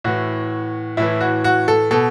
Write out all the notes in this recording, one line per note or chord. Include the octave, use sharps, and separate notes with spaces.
A2 E3 F#4
A2 E3 E4
F#4
F#4
A4
B2 A4